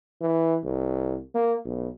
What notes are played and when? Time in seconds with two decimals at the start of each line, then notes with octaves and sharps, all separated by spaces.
0.21 E3
0.64 C2
1.35 A#3
1.66 B1